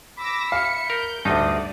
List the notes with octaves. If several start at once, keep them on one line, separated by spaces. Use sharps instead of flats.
B5 D6 E6 A#6
E5 F5 C#7
A#4 G6
D2 G2 D#4 D5 D#6